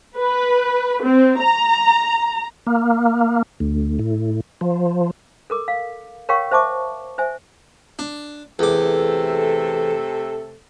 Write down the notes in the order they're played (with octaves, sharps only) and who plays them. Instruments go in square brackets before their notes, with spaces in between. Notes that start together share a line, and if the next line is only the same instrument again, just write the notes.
[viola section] B4
C4
A#5
[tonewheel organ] A#3
D2
A2
F3
[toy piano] A4 A#4 D6
F5
A#4 C#5 F5 G5 C#6
C5 E5 A5 C#6 D6
C5 E5 G#5
[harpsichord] D4
[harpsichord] E2 D6 [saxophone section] C3 A3 A4